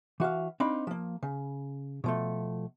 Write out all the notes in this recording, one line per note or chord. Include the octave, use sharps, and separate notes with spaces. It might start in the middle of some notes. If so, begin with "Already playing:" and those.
E3 F#4 E5 F5
C4 D4 D#4 F5 B5
F3 A#3
C#3
B2 F3 A3